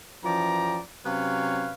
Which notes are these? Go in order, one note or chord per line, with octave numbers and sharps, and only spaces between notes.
F#2 E3 F3 D5 G5 A#5
C3 F#3 C#4 B4 C#5 F5